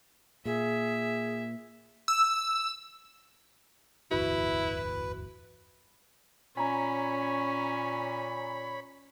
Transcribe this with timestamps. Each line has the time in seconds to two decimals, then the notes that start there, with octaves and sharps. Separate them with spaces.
0.45 A#2 G#4 E5
2.08 E6
4.11 D1 G1 E2 E4 F#4 B4
6.57 A#2 C#4 C#5 G#5 A#5 B5